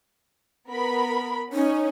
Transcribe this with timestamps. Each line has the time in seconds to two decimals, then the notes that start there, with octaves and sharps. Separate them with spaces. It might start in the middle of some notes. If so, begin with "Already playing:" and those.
0.71 B3 A#4 B5
1.53 C#4 D#4